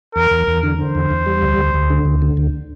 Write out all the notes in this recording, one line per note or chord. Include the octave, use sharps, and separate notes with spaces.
E2 A#4
E2
E2
D3
D3 C5
E2
E2
G3
D2
D2
D2
D3
D2
D3
D2